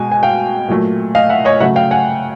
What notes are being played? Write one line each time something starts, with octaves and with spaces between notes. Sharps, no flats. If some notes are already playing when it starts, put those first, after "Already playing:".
Already playing: B2 G#3 G#5
G#5
F5 G5
A#2 F#3 A3
D#5 F5
E5 F#5
C#5 D#5
C#3 F#3 A3 E5 F#5
F5 G5
F#5 G#5